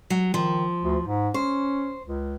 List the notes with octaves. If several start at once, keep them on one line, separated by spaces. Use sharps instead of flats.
F#3
D#3 F3
D2
G#2
C#4 C5
C#2